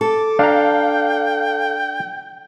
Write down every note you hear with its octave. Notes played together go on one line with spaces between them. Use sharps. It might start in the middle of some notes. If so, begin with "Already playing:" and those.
A4 D6
D4 F5 G5 A#5